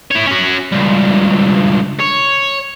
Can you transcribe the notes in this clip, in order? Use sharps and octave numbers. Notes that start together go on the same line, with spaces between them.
E4 C#5
C#4 F#4
C#2 G2
C#5